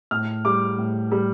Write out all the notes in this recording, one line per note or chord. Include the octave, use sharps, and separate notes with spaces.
A2 F6
G3 D6
A2
G3